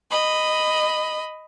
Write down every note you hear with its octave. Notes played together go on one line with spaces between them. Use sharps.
D#5 B5